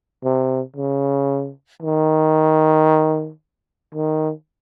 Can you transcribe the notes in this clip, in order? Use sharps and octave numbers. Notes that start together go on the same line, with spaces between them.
C3
C#3
D#3
D#3